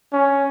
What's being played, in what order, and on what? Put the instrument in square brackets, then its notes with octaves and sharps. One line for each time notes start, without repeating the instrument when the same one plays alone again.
[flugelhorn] C#4